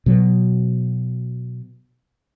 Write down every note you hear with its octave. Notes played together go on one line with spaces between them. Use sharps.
B2 F#3